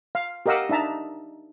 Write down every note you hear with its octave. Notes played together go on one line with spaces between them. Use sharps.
F5
G4 A#4 D#5 F5 F#5 E6
D4 D#4 E5 A5 A#5